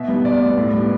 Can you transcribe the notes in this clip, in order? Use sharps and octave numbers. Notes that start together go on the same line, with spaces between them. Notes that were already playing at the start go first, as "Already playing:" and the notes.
Already playing: B2 E5
G3 B3
B2 D5
G3 B3
A2
G3 B3